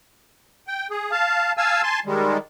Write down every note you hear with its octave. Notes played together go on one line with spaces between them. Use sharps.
G5
G#4
F5 A5
F5 G#5 A5 E6
G#5 A5 C6
D#3 G3 G#3